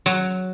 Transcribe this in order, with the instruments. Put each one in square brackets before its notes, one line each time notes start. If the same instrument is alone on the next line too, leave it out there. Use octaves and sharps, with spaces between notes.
[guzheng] F#3